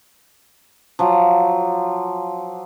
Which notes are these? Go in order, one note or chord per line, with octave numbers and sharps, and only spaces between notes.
F3 F#3